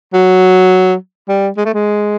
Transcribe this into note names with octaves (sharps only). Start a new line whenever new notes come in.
F#3
G3
G#3
A3
G#3